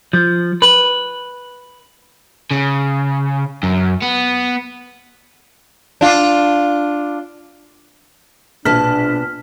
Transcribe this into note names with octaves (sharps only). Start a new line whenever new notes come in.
F3
B4
C#3
F#2
B3
D4 F4
A#1 B2 D4 A5 F6 B6